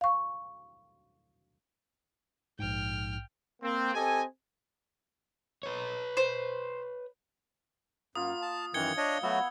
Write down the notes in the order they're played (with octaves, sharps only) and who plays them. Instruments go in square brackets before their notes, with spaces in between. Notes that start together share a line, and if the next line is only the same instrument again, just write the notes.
[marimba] F5 C#6
[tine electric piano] A#1 G#2 [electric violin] G5 F6
[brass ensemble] A#3 C4
C4 G4 A4 D#5 G#5
[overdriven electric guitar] B4 C#5
[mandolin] C5
[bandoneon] F#2 [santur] A#3 F4 [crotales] D#6
[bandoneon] A5
[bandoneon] F#2 D#3 E3 [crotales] G#6 C#7 G7
[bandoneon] D4 C#5 D#5
[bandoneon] F#3 A3 F#4 [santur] B3 F#5 E6